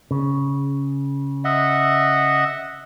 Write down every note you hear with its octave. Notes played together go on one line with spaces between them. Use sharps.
C#3
D#5 E5 F#5